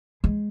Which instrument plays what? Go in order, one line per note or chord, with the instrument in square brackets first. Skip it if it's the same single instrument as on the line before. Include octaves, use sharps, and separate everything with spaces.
[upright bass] G#3